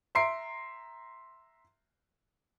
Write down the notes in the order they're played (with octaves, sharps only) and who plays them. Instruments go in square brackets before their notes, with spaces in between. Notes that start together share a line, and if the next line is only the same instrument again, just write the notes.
[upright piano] E5 A#5 C6 C7 D7